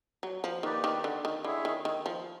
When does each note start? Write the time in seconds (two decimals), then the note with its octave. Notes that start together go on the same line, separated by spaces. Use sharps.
0.23 F#3
0.44 F3
0.63 D#3 A#3 D#4 G4 B4 D5
0.84 D#3
1.04 D3
1.25 D#3
1.44 D3 E4 G#4 C#5 E5
1.65 D#3
1.85 D#3
2.06 F3